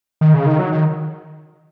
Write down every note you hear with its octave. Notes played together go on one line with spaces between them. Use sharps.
D#3
C#3
D#3
F#3
D#3